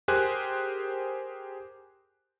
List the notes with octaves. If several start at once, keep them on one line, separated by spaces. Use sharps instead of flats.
G4 G#4 A#4 C5 G#5 F#6